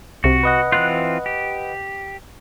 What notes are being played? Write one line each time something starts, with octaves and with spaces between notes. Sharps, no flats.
C2 C3 F#4
B4 D#5 F#5
E3 C4 F4 F#6
G4